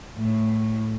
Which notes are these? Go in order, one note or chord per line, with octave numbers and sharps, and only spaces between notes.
A2